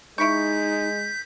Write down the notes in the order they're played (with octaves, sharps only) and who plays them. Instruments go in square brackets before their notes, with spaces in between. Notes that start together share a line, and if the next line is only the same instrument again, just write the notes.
[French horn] G#3 [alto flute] D#4 [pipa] E4 C#6 [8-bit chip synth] G6 B6